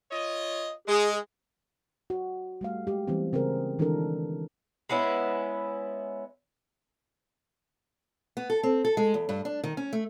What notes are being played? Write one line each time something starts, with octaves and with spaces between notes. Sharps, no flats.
F4 C#5 D#5
G#3 G#4
F#4
G3 A3 F5
G#3 G4
E3 G3 G#3 B3 C4
C#3 C4 G#4 A#4
D#3 E3 G#3 D4 A4 A#4
G#3 B3 C#4 E4
B3
A4
C4
A4
G#3
E2
G2
D4
D#3
C#4
A3